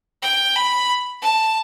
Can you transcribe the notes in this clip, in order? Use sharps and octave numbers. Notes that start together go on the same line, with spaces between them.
G5
B5
A5